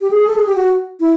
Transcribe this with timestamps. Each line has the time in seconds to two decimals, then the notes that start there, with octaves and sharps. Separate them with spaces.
0.01 G4
0.11 G#4
0.27 A4
0.36 G#4
0.46 G4
0.56 F#4
1.00 E4